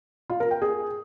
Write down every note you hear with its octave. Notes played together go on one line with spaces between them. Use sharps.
F4
A#4
G5
G#4